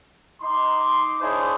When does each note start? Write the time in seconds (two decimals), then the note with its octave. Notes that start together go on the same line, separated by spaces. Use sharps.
0.42 D#4 C6 D6
1.22 D4 E4 G#4 C5 C#5 D#5